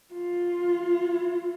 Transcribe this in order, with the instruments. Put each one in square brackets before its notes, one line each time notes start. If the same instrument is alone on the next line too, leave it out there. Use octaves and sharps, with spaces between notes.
[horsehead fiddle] F4